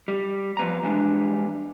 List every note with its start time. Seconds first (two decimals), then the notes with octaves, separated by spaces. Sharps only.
0.08 G3
0.57 F3 B3 A#5
0.83 E3 G3 G#3 D4